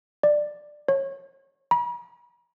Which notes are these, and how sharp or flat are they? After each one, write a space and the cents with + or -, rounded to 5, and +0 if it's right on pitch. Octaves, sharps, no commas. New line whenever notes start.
D5 +15
C#5 -25
B5 -45